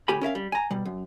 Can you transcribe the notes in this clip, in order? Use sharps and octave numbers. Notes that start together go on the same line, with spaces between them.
D2 A2 G4 G#5 B5
C#4 A#4 E5 F5
G3
G#5 A#5
B2 G3
F#2